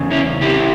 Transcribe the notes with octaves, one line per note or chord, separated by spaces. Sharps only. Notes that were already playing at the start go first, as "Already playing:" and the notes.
Already playing: E2 C#3
C#4 E4
E4 G4